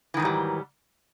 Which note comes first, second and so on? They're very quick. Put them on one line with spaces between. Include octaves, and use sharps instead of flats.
E3 D#3 G#2 F#3 G3